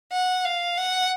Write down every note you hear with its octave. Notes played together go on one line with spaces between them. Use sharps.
F#5
F5
F#5